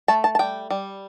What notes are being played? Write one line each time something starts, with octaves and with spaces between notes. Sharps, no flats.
A3 A5
A5
A5
G3 G5
G3